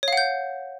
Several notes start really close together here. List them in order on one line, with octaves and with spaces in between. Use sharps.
C#5 F5 F#5 G6